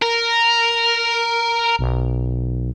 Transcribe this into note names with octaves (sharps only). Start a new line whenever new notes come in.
A#4
B1